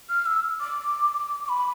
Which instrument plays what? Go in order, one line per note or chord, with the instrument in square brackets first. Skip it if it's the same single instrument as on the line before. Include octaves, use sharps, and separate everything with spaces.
[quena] F6
E6
D6
D6
B5